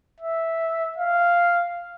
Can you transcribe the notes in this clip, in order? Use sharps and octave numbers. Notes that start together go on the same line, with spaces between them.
E5
F5